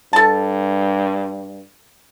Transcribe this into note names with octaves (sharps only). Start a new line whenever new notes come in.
G2 A4 A5